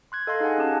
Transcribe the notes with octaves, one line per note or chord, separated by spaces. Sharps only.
C6 F#6 G#6
A4 D#5 F5 C6 F#6
D#4 G#4 F5 F#5 G#5
C#4 G4 A5